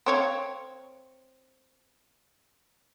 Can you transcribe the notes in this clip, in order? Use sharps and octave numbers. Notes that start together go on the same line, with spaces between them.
C4 C#5 F5